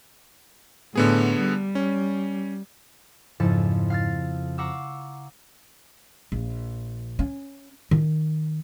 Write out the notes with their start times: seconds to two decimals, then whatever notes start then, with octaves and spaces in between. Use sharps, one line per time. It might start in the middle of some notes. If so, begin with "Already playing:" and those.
0.95 A2 D3 B3 G#4
1.40 G3
1.75 C#4
3.40 F2 G#2 C#3 F3 E4 A4
3.90 F5 F6 A6
4.58 F5 F#5 A#5 C#6 D6 E6
6.32 A#1
7.19 C#4
7.91 D#3